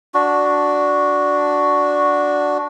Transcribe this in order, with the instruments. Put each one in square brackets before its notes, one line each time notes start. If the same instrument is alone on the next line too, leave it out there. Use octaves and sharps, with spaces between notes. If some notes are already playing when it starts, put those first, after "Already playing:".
[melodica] D4 F#4